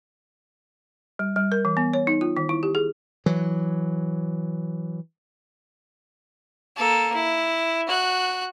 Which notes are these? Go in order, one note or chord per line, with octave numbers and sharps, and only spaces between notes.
G3
G3
A#4
E3
B3
C#5
D#4
F4
D#3
E4
G4
G#4
E3 F#3
A#3 A4
E4
F#4 F#6